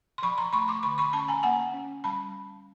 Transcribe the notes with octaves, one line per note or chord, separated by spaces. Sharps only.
C6
F3 B5 C#6
A#5 C6
A3 B5 C#6
C6 D6
D3 B5 C#6
B5 C#6
C#4 A5 B5
G#5 A#5
A#3 F#5 G#5
C#4
G3 A5 B5